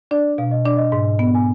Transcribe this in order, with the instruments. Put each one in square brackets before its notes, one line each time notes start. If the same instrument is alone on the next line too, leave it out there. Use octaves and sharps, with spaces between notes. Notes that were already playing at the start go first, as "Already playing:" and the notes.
[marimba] D4 [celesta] D5
[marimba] B2 [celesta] F5
[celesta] D#5
[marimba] D4 [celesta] D5
[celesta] D#5
[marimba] G#2
B3
[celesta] G#5